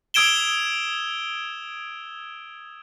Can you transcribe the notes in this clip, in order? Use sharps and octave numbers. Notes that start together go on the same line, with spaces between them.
D#6 E6 G#6 D7 E7 G7